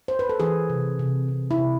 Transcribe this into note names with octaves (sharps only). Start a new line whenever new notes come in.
C5
B4
A4
E3 G#4
C3
C3
C3
E4
C3